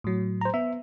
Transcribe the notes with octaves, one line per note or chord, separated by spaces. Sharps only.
A2 F#3
C5 A#5
B3 E5